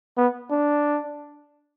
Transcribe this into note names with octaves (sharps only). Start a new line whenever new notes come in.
B3
D4